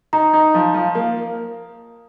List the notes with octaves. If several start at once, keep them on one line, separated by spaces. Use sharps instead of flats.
D#4 A#5
D#4
F3
F3
A#3